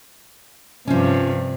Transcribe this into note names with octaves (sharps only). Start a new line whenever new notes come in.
G2 C3 F3 C#4